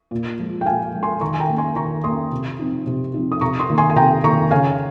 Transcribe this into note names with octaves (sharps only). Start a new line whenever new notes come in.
A#2
F3 G#3
G5
A#2 F5 G#5
F3 G#3
G#5 C6
D#3 A#5 C#6
G#5
G5 A#5
A#3 C#4
G#5 C6
D#3 A#5 C#6
A#3 C#4 C6 D#6
C3
F3 C4 D#4
C3
F3 C4 D#4
D#6
C3 A#5 C#6
C6 D#6
D#3 A#3
G#5 C6
G#5
C3 G5 A#5
D#3 A#3 A#5 C#6
C#3 F5 G#5